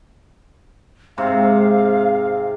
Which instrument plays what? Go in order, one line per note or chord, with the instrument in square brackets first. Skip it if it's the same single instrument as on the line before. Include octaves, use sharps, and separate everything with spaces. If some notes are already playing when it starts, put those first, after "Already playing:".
[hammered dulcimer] G#2 C3 C4 [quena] F5